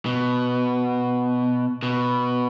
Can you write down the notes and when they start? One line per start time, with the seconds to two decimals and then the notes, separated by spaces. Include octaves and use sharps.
0.06 B2
1.83 B2